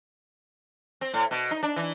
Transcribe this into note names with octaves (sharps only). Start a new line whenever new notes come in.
C4
A2
B2
D#4
D4
E3